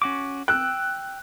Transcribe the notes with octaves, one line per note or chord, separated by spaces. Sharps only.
C#4 F#4 D6
G5 E6 F#6